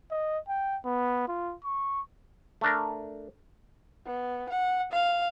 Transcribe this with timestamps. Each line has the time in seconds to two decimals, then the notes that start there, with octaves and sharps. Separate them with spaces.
0.11 D#5
0.49 G5
0.85 B3
1.28 F4
1.64 C#6
2.61 A3 D4 A#4
4.06 B3
4.50 F#5
4.92 F5